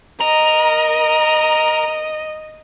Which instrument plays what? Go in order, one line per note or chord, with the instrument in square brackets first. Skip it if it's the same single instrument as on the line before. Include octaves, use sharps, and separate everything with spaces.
[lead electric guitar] A#4 [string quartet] D#5